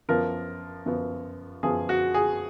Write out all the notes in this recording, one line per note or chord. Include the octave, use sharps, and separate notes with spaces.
F#2 F3 B3 A#4
F#2 F3 B3
F#2 F3 B3 G#4
F#4
G#4